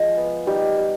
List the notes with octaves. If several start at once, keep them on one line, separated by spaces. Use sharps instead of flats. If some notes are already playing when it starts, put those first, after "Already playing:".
Already playing: F3 G#3 F4
B3
G3 D#4 G4
G3